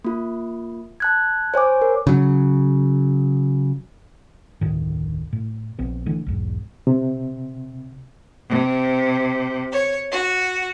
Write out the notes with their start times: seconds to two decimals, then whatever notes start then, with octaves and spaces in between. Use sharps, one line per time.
0.05 A#3 F4
1.00 A5 F#6 G#6
1.54 C5 C#5 G#5 D6
1.82 A#4
2.07 C#3 F#3
4.61 F1 D2 A2 D#3
5.33 A2
5.79 A#1 B3 C4
6.06 D3 E3 A3
6.26 B1 E2 G#2
6.87 C3
8.48 C3
9.71 C#5
10.11 F#4